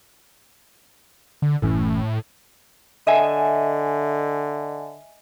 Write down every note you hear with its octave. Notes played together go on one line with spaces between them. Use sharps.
D3
F#1 A2 E3 C#4
D3 D#5 E5 G#5